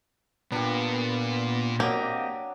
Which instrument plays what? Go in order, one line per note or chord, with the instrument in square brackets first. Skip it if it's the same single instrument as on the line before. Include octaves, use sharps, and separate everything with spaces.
[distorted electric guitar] A#2 [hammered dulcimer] G3 D4 [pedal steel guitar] B3
[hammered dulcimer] F#3 D6 [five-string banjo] A#3 [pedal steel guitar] C4 G4 D#5